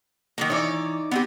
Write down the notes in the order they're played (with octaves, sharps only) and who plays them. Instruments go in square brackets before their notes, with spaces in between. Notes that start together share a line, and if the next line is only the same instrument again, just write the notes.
[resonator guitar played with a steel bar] D#3 F#3 A#3
[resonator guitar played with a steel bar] E3 C#5 [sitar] D#4 D5
[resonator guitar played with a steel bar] B3 C4 G4